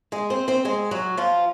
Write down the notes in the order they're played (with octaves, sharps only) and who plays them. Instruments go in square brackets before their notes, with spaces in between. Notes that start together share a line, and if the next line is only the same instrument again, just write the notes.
[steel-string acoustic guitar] G#3 G#4
C4 C5
C4 C5
G#3 G#4
F#3 F#4
F3 F4